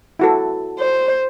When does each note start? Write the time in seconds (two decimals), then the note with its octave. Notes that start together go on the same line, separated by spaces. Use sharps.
0.19 E4 F#4 A4
0.79 C5